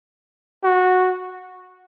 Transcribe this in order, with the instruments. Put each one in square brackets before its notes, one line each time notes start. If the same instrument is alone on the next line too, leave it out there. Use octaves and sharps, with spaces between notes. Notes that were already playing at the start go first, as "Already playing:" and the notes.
[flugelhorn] F#4